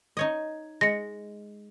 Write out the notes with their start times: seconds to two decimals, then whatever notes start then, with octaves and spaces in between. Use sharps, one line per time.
0.17 D#4 C#5 D#5
0.81 G#3 A#6 C#7